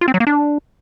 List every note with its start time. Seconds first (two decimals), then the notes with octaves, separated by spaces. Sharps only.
0.01 F4
0.08 C4
0.14 F#3
0.20 A#3
0.27 D4